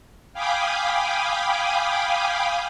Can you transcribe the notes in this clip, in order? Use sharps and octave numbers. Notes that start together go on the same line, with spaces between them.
F5 G5 G#5 B5 D6 D#6